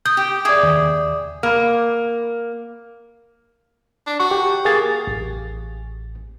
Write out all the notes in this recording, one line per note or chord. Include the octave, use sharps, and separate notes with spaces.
D#6 G6
G4
G#4 D5 E5 D6 D#6
D#2
A#3
D4
F#4 C#6
G4
A#3 G#4 A6
A1